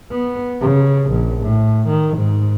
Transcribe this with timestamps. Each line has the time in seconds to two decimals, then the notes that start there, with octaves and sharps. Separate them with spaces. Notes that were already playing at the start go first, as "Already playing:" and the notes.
0.11 B3
0.61 C#3
1.11 A#1
1.42 A2
1.88 D#3
2.18 G#2